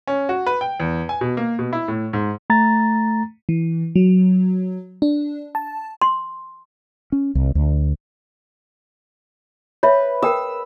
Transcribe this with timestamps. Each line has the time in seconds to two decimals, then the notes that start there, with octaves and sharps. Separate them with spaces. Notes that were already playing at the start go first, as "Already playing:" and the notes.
0.07 C#4
0.29 F#4
0.47 B4
0.61 G5
0.80 E2
1.09 G#5
1.21 B2
1.37 A#3
1.59 B2
1.73 E4
1.88 A2
2.13 G#2
2.50 A3 A#5 A6
3.49 E3
3.96 F#3
5.02 D4
5.55 A5
6.02 C6
7.12 C#4
7.35 C2
7.55 D2
9.83 B4 C#5 E5
10.22 A#4 G5 D#6 E6